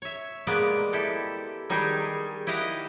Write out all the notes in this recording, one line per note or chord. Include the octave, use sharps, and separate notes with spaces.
C#5 E5
G#3 A#3 B3 G4 D5
E4 G4 A4
D#3 G3 D#4 G4 G#4
E4 G4 D#5 F5 F#5